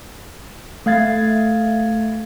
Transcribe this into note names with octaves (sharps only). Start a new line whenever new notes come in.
A3 F5 G#6 A6